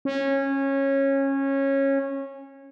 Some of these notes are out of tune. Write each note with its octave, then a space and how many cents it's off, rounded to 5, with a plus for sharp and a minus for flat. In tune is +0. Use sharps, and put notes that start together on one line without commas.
C#4 -20